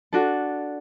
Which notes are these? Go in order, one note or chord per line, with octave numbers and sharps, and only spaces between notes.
D4 F#4 A4